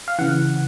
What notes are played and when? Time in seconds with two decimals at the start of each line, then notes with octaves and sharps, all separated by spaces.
0.08 F5
0.19 C#3 E3 F#5